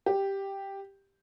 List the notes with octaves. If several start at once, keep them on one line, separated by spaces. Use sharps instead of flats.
G4